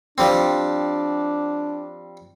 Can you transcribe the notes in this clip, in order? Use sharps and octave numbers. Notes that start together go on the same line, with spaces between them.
F3 G3 C4 D4